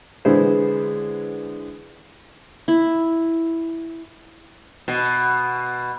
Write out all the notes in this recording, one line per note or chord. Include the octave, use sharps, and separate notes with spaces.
D3 E3 G#3 B3 E4 C5
E4
B2